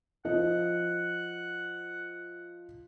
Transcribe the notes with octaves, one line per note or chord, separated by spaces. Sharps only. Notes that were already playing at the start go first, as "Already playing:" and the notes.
F3 D#5 F#5